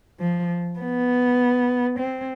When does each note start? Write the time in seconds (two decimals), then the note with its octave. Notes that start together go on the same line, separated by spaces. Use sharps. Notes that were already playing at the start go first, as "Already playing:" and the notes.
0.20 F3
0.80 B3
1.99 C4